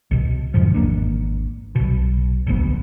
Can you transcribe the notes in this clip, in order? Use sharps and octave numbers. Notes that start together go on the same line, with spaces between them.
C2 B2
E2 G#2 D3 F3
G#1 A2 A#3 D4
B1 B2
D1 G1 D2 B3